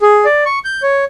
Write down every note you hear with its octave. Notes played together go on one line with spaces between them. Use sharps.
G#4
D5
C#6
G6
C#5